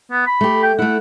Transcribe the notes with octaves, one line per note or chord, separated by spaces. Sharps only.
B3
B5
A3 G4
G5
A3 E4 F#5